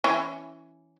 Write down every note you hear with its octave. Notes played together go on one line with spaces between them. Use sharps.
E3 C#4